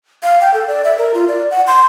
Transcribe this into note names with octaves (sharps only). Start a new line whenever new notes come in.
F5
G5
A4
D5
E5
A#4
F4
D5
F#5
C6